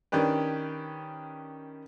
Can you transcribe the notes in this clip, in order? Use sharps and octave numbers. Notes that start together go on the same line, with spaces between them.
D#3 C#4 D4 G4 B4